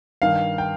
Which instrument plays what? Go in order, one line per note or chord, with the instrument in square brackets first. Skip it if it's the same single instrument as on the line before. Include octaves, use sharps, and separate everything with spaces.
[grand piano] G2 D#3 F5
G5